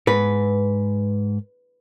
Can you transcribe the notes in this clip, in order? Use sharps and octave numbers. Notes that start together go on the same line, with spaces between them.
G#2 B4